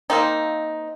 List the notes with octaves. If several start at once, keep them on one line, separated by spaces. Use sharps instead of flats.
A#3 C4 D#4